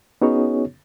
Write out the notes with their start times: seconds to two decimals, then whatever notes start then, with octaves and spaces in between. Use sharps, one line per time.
0.22 B3 C#4 D#4 F#4 G#4 C#5